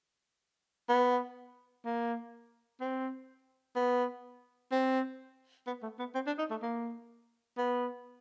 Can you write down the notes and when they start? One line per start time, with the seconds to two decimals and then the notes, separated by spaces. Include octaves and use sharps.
0.89 B3
1.85 A#3
2.81 C4
3.76 B3
4.72 C4
5.67 B3
5.83 A3
5.99 B3
6.15 C4
6.27 D4
6.39 D#4
6.50 A3
6.62 A#3
7.58 B3